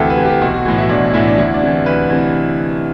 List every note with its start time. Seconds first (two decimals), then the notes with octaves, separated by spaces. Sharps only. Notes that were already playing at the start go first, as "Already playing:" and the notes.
Already playing: D2 C3 E3 G4 A4 E5
0.10 B4
0.17 C3 E3
0.25 G4
0.41 B1 F#4
0.54 F#4
0.65 A2 E3
0.78 E4
0.89 B1 D4
1.14 A2 E3 E4
1.28 D4
1.38 D2 E4
1.54 D4
1.62 C3 E3
1.86 D2 B4
2.10 C3 E3